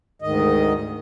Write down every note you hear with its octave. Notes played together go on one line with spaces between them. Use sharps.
D2 G#2 D#3 D#5